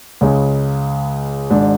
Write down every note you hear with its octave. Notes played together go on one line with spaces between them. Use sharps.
C#2 C#3 G#3
G#1 G#2 G#3 D4